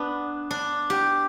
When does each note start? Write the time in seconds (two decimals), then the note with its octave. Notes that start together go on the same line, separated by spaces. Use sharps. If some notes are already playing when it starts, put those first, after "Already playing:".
Already playing: B3 D4
0.51 D4
0.90 G4